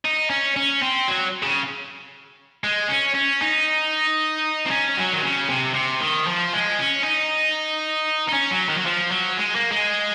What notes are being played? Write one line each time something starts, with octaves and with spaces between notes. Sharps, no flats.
D#4
C#4
C#4
C4
F#3
C#3
G#3
C#4
C#4
D#4
C4
C#4
F#3
D#3
C#3
C3
C3
D#3
F3
G#3
C#4
D#4
D#4
C#4
F#3
D#3
F#3
F3
F#3
G#3
A#3
G#3